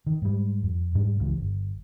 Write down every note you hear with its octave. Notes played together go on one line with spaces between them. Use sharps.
D#3
G#2 G3
F2
G#2 G3 D4
C#2 C#3 E3
G1